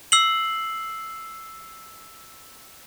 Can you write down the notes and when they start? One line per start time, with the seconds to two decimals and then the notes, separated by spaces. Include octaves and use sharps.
0.12 E6 C7 F#7